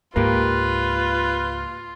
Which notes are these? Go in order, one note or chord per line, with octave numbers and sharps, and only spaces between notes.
C#2 G#2 A#3 F4 G4 B4